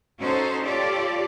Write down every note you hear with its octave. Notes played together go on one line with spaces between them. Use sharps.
C#4 D#4 F#4 A4 C5
F4 G4 A4 C#5 D5